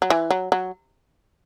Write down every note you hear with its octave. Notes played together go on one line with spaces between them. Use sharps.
F#3
E3
F#3
F#3